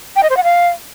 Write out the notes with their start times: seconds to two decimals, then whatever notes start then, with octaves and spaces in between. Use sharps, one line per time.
0.16 G5
0.23 D#5
0.30 C5
0.37 F#5
0.44 F5